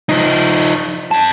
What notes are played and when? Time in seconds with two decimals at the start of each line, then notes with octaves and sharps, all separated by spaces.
0.09 F3 D#4
1.11 F2 A5